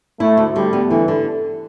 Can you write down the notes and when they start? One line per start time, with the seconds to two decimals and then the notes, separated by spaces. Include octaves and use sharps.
0.20 A3 E4
0.37 D2
0.56 D3 G3
0.73 B3
0.90 D3 E3
1.08 D3